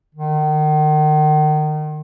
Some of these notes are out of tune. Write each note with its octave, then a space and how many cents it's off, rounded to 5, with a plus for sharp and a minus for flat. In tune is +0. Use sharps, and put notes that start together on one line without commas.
D#3 -35